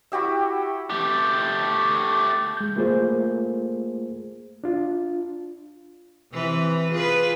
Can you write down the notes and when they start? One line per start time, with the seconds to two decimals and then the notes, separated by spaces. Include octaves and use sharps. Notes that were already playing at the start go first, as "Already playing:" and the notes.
0.12 E4 F#4 G4 E5
0.90 A3 G4
2.57 G#3 G6
2.76 A3 A#3 F4 G#4 A#4 C5
4.64 D4 F4
6.32 C3 E3 B4
6.91 F4 G#4 B4